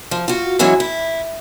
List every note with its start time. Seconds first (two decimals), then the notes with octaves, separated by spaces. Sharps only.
0.11 F3
0.28 F4 F#4
0.59 E3 F#3 G#3 C#4 E4
0.80 E4